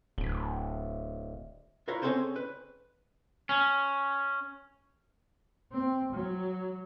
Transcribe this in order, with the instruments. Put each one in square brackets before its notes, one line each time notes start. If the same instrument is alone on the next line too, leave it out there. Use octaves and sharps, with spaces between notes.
[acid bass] D1
[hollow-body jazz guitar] E4 F4 A#4 B4 C#5 A#5
C4 C#4 G#4 A4 C5 C#5
B4
[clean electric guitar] C#4
[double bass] C4
F#3